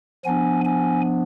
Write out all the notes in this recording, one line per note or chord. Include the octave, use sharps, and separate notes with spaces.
F3 B3 D4 G#5
G#5